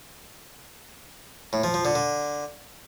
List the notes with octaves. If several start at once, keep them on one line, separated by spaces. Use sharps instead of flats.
A2
F3
F3
D3
D3